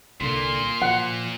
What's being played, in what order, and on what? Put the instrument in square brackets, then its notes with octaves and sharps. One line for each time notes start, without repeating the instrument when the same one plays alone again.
[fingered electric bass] C2 D3 [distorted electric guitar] A#2 A#3 [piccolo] C6
[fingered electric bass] F3 [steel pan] F#5